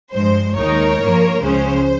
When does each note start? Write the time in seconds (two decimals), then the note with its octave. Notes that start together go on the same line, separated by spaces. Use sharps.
0.13 G2 F3 G#3 C5
0.56 D#2 D#3 G#3 D#4 A#4 C#5
0.99 G2 F3 A#3
1.41 C#2 C#3 F3 G#3 C#4 C5